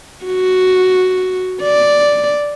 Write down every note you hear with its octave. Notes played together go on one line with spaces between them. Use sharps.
F#4
D5